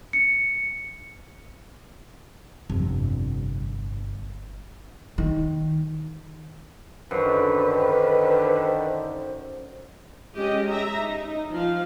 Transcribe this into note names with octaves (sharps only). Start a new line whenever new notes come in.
C#7
G1 F2 C3
D#3
F#2 D3 D#3 B4 C5
G#3 C#4 G4 D#5
E5 A#5
D#4
F3 F5